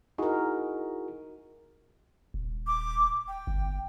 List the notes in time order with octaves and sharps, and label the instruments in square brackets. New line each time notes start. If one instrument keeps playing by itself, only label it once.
[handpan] D#4 A#4 [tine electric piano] E4 F#4 G#4
[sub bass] D#1
[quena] D6
G5
[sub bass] G1